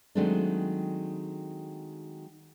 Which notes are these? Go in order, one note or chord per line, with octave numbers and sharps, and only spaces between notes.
D#3 F#3 G#3 A3 C4 D4